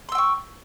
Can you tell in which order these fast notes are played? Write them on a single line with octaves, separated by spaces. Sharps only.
C6 E6 G5 C#6